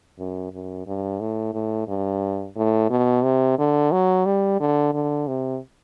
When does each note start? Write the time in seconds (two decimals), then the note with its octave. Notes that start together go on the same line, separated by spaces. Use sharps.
0.18 F#2
0.52 F#2
0.87 G2
1.20 A2
1.53 A2
1.88 G2
2.56 A2
2.90 B2
3.24 C3
3.58 D3
3.92 F#3
4.26 G3
4.60 D3
4.94 D3
5.27 C3